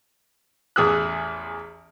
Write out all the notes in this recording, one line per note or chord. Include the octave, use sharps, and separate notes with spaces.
A1 E2 G#4 D#6 E6 F#6